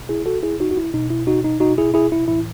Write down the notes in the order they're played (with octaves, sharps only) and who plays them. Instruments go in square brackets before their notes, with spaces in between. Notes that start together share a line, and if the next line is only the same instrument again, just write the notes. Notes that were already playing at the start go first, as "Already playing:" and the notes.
Already playing: [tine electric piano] B2
E4 G#4
F#4 A4
E4 G#4
D#4 F#4
F#4
E4
B2 D#4
E4
D#4 F#4
D#4
D#4 F#4
E4 G#4
E4 G#4
E4
A2 E3 E4